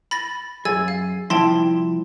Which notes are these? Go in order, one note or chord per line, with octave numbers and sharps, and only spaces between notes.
B5 A6 A#6
F#2 G#4 G#5 E6 A6
F5
C2 F3 E4 G5 A5 C6